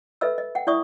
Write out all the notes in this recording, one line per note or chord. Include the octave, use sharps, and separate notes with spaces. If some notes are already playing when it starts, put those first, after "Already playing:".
A4 B4 D#5 E5 B5 E6
D#5
F#5 G5
E4 D5 E5 C#6 D#6